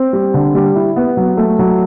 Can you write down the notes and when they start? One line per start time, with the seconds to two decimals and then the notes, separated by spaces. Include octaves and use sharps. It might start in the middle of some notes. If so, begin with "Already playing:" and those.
Already playing: C4
0.13 G3
0.34 D3
0.55 G3
0.76 E4
0.96 B3
1.17 F#3
1.37 A3
1.59 F#3